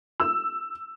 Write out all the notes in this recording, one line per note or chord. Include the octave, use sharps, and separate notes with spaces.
E6